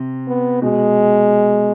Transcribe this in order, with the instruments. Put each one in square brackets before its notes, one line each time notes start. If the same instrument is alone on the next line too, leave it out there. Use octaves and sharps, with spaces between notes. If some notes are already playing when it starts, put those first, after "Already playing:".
Already playing: [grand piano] C3
[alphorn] B3
[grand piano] B2 [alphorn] G#3